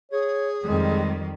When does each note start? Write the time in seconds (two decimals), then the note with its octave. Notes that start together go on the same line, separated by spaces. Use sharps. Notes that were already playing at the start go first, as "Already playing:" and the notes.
0.12 G#4 C#5
0.64 F2 D#3 G3 G#3